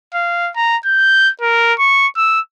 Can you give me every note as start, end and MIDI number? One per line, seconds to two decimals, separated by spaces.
0.14 0.51 77
0.56 0.77 82
0.86 1.30 91
1.41 1.74 70
1.79 2.07 85
2.17 2.41 88